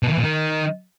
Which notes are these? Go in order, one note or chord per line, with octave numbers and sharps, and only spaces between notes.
B2
D#3
E3
A#2
D#3